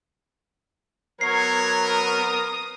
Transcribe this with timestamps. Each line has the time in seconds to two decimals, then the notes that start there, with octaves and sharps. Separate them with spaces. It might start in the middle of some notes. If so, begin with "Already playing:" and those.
1.21 F#3 B3 A#4 C#5 G#6 C7
1.88 D#6